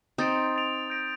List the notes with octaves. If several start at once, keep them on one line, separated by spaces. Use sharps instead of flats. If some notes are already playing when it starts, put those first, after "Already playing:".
C4 D#4 D#6 A6 D7 F7
D#6 A6 D7 F7
G6 A#6 D7